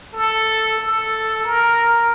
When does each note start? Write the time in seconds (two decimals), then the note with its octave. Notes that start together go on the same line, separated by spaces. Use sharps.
0.14 A4
0.78 A4
1.44 A#4